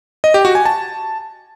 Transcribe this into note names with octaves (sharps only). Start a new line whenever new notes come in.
D#5
G4
F#4
G#5
A5